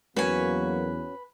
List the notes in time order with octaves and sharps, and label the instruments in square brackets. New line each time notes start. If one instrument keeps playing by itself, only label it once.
[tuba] E2 [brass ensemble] F#3 A#3 [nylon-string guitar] C#4 F#4 C#5 [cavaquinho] B4 G#5